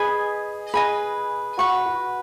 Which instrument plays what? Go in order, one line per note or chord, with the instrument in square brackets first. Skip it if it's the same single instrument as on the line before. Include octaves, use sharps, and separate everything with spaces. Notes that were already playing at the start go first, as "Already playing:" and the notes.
Already playing: [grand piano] G#4 [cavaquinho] B4 D#5 G#5 B5
[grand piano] G#4 [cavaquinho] B4 D#5 G#5 B5
[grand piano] F#4 [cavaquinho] B4 F#5 C#6
[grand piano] F#4